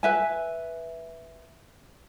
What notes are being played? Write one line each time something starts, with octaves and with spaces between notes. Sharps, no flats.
B4 E5 G#5